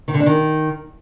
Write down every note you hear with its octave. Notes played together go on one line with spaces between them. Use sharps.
D#3
D3
D4
D#3